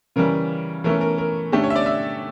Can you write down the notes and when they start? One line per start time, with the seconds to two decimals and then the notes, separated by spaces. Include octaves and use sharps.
0.16 C#3 E3 G3 C#4 A#4
0.84 E3 A3 C#4 A#4
1.01 A#4
1.18 A#4
1.52 D3 A3 C#4 G4
1.64 C#5
1.70 E5
1.76 D5
1.86 E5